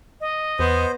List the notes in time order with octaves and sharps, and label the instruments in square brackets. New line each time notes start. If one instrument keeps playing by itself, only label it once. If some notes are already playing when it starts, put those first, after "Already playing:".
[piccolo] D#5
[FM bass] E2 [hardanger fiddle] B3 [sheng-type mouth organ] C5